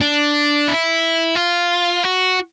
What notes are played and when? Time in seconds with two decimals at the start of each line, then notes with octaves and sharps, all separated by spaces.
0.01 D4
0.68 E4
1.36 F4
2.04 F#4